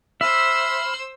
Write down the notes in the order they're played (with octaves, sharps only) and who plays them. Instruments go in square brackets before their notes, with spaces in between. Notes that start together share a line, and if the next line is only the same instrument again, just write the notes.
[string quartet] C5 E6 [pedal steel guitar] E5 [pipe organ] B5 F6